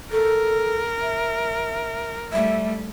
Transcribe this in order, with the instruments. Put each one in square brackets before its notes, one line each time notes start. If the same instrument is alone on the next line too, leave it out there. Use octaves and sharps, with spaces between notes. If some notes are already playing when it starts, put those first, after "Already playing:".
[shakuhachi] A4 [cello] A#4
[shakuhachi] E5
[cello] G3 A3 [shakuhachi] E5